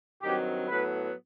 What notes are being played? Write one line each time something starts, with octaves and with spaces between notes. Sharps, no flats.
G2 D#3 F#3 C4 G4
A2 F#3 B3 B4